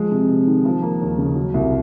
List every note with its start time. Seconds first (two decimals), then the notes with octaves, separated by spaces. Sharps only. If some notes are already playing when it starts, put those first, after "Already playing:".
Already playing: F3 G#3
0.11 C3
0.29 C3
0.47 D#3
0.65 F3
0.82 A#3
1.01 D#2
1.18 C#3
1.36 F#3
1.54 C2